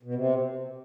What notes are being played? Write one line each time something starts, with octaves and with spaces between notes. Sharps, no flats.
B2
C3